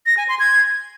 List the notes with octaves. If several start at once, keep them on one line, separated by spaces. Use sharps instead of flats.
A#6
G#5
C6
G#6